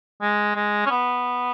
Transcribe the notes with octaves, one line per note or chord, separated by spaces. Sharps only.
G#3
G#3
C#4
B3